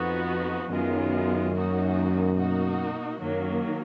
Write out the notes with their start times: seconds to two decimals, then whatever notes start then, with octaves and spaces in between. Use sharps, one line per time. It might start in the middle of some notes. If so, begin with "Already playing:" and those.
Already playing: F2 F3 B3 D#4 F#4
0.69 F#2 D#3 G#3 B3 F4
1.53 D#3 A#3 D#4 F#4
2.37 B2 A#3 D#4 F#4
3.21 F#2 D#3 F#3 A#3